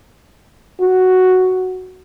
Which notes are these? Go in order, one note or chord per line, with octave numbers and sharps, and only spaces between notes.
F#4